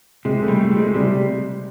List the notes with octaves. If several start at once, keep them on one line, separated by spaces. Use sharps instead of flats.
C3 G#3
A3
G3
A3
C3
G#3
C3 G3